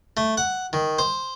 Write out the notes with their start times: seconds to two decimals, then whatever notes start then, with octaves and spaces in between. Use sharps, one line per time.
0.17 A3
0.37 F#5
0.73 D#3
0.99 C5